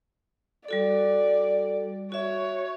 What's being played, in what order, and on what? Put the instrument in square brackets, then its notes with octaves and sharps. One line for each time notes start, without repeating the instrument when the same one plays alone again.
[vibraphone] G3 F#4 A4 [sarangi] D5
[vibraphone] F#4 E5 [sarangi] C#5